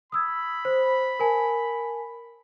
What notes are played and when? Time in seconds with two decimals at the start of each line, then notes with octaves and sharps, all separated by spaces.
0.12 B5 D#6 E6 G#6
0.65 C5
1.20 A#4 G#5 A5